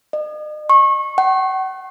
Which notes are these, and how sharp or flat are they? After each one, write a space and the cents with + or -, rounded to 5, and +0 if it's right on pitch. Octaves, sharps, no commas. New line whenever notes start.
D#5 -40
C#6 -30
F#5 +40